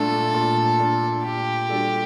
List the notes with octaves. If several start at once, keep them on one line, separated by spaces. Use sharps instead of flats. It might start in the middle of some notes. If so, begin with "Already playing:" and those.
Already playing: A#2 A3 D4 A4
A#2
A3 D4
A#2 G4
G3 D4 F#4 A4